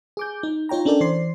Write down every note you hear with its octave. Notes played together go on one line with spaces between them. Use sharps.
G#4 D6 G6
D#4
D#4 F4 C#5 G5 A#5
C#4 D4 A4 A#4 D5 G5
E3 C5 D5 C6 C7